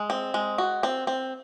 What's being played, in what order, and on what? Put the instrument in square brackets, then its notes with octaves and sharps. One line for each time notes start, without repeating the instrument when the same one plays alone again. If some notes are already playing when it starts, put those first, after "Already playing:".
Already playing: [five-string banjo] G#3
C4
G#3
F#4
C4
C4